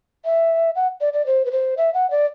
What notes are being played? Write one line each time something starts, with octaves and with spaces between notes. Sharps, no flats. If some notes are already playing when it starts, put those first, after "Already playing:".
E5
F#5
D5
D5
C5
B4
C5
E5
F#5
D5